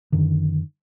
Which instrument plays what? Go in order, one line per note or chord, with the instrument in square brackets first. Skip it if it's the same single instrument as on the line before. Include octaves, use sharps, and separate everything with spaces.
[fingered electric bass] F#2 D3 D#3